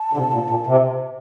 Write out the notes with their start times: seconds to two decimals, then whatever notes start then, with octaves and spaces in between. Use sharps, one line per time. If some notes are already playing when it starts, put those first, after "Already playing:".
Already playing: A5
0.13 D3
0.17 C3
0.33 A#2
0.50 A#2
0.67 C3